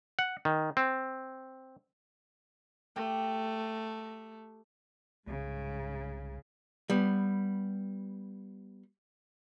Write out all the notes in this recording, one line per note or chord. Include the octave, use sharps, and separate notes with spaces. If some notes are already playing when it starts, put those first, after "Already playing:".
F#5
D#3
C4
A3 G4
C2 G#2 C#3
G3 B3